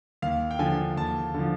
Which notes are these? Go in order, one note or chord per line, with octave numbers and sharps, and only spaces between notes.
D#2 F5
G5
D3 F3 G#5
D#2 A5
D3 F3